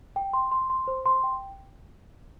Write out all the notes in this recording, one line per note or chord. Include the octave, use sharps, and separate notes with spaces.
G5
C6
C6
C6
C5
C6
G5